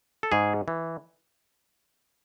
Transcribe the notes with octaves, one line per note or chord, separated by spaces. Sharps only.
A4
G#2 G#4
E3